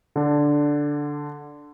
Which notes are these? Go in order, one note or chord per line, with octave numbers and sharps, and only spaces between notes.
D3 D4